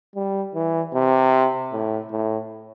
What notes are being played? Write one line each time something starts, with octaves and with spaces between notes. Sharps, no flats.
G3
E3
C3
A2
A2